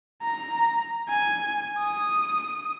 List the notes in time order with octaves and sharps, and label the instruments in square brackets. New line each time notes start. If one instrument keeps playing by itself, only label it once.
[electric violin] A#5
G#5
D#6